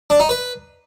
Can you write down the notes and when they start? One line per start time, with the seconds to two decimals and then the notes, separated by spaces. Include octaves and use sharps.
0.10 D4
0.20 D#4
0.29 B4